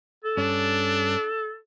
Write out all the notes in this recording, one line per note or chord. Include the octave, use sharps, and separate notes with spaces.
A4
G2 C#4 D4